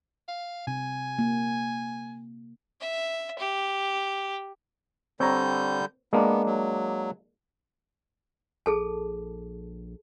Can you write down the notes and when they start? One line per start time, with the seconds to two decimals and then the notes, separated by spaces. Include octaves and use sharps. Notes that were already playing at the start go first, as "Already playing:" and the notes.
0.28 F5
0.67 C3 G#5
1.19 A#3
2.81 E5
3.39 G4
5.20 D3 G3 C4 C#5 A#5 G6
6.13 G#3 A#3 B3 D4
6.46 F#3
8.66 A#1 G#4 A4 A5